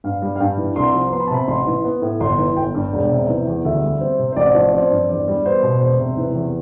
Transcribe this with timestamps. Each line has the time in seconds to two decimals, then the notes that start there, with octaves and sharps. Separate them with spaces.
0.04 G2 F5
0.22 G3
0.36 F5
0.40 G2 G5
0.57 E3
0.76 C2 C6
0.94 F3
1.12 B3 C6
1.20 B5
1.27 A5
1.31 C3 B5
1.48 A1 C6
1.67 E3
1.84 B3
2.02 A2
2.20 G1 C6
2.38 E3
2.57 G1 G5
2.75 G2
2.93 E1
3.11 C3
3.29 E3
3.47 E2
3.65 D2 E5
3.82 G3
4.01 C4
4.19 C3
4.33 C5
4.36 A1 D5
4.55 F3
4.73 C4 D5
4.91 G2
5.09 E2 D5
5.28 G3
5.45 B3 C5
5.63 B2
5.81 E1 C5
5.99 C3
6.17 E3 B4
6.35 E2